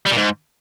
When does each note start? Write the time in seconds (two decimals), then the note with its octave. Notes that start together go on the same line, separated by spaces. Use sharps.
0.06 G3
0.12 A#2
0.17 G#2